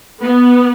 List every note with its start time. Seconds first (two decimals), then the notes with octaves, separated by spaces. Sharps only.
0.21 B3